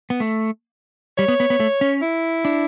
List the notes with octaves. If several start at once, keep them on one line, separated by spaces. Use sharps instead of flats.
B3
A3
G3 C#5
B3
B3
B3
A3
C#4
E4
D4